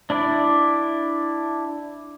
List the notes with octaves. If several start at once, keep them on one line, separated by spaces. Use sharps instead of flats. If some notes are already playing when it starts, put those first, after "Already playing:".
D4 E4 D5